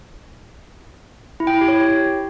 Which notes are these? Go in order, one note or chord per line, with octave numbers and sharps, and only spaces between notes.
E4
G5
E4
G4
C#5